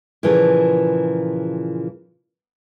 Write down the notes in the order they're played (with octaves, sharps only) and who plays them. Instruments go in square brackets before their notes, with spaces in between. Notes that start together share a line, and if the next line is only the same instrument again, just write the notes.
[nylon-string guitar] A#2 C#3 E3 F3 G#4 A4